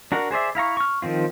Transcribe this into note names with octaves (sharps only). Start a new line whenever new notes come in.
D4 F#4 A#4 F#5
G#4 C5 D5 E5
E4 F5 A#5 C#6
C#6 F6
D#3 F3 C4 F4